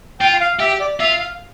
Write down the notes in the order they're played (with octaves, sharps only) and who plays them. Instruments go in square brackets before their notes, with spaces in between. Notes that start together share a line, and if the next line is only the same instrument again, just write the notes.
[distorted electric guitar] F4 [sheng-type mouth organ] G5
[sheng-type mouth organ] F5
[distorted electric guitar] G4 [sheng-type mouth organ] E5
[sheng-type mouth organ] D5
[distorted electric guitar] F4 [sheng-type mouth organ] E5
[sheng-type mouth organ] F5